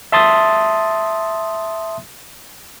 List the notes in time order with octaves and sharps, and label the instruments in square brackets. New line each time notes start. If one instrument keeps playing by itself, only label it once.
[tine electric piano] E5 A5 C6 D#6 A6